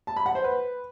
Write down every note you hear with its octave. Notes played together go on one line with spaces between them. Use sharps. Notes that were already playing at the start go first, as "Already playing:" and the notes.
A5
B5
F#5
C5
B4